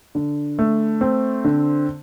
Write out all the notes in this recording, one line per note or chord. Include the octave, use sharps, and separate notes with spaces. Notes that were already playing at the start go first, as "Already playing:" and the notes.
D3
A3
C4
D3